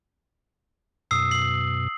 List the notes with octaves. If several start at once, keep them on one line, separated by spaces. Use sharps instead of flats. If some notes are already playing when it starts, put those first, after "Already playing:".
F#2 B2 D#6 E6 C7
C7 F#7